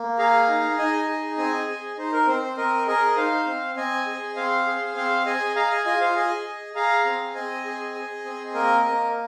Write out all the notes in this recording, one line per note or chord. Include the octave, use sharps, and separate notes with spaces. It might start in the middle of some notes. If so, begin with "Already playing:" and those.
Already playing: A#3
G#4 F5 A#5
D#4
D#4 D#5 G#5
G#4
C4 D#5 G#5
G#4
D#4 C5
A#4
C4 C5
C5
C4 A#4 D#5
G#4 A#4 D#5
D#4 C5 F5
C4
C4 D#5 G#5
G#4
C4 C5 F5
G#4
C4 C5 F5
G#4 D#5 G#5
G#4 F5 A#5
D#5 G#5
F4 D#5 G#5
C5 F5
G#4 D#5 G#5
G#4
G#4 F5 A#5
C4
C4 D#5 G#5
G#4
G#4
C4
A#3 A#4 D#5
A#3